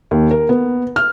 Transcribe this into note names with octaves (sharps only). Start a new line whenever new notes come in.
D#2
A#4
B3
F6